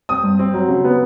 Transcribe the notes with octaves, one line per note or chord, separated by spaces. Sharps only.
C4 D#6
G2
C4
F#3
C#3
B3